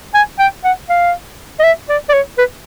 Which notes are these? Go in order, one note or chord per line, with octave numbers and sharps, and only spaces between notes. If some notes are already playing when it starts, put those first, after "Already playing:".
G#5
G5
F#5
F5
D#5
E5
D5
D5
C#5
B4